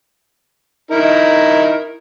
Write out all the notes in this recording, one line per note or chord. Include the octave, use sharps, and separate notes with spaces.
D#4 E4 A#4